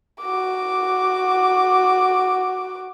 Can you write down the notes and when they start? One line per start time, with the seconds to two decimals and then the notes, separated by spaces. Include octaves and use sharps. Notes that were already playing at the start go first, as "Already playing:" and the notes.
0.21 F#4 D6